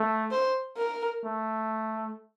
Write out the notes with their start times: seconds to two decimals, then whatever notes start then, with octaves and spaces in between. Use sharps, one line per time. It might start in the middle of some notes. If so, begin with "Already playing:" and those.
Already playing: A3
0.31 C5
0.77 A#4
1.25 A3